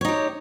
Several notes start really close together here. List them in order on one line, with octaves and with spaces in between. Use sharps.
C#5 D#4 G4